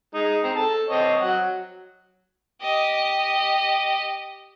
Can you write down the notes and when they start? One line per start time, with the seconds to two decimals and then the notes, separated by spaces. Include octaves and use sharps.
0.14 G#3 D#4
0.43 C4 A#5
0.56 A4 A5
0.89 C4 C#5 D#5
1.21 F#3 F#5
2.61 G4 D#5